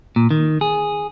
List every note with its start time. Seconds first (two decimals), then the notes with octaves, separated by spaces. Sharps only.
0.16 A#2
0.31 D#3
0.61 G#4